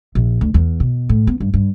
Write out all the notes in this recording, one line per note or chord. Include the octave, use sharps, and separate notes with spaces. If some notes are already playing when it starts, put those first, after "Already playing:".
A#1
D2
E2
B2
A2
B3
G2
G2